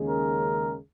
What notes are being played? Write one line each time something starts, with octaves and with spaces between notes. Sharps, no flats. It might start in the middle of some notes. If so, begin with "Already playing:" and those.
Already playing: D#2 C#3 G#3 C#4 G#4
A#4